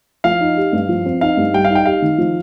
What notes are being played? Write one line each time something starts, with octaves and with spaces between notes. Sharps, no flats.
F3 F5
D#4
G4
G2
F3
C4
D#4 F5
G2
G3 G5
F5
D#4
G5
G4 F5
D#3
F3